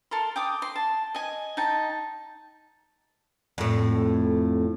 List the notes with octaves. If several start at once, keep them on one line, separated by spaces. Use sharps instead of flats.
A4 A#4 C6
G5 D6 D#6
C6
A5
D#5 G#5
D#4 G5 A5
F2 A2